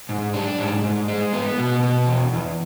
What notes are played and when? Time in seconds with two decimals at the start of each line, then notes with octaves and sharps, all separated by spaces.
0.09 G#2
0.34 D4
0.59 G#2
0.84 G#2
1.08 G#3
1.33 B3
1.58 B2
1.83 B2
2.07 E2
2.33 E2